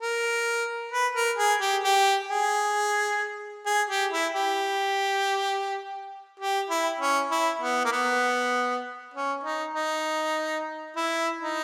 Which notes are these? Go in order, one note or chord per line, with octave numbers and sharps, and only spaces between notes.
A#4
B4
A#4
G#4
G4
G4
G#4
G#4
G4
E4
G4
G4
E4
C#4
E4
B3
A#3
B3
C#4
D#4
D#4
E4
D#4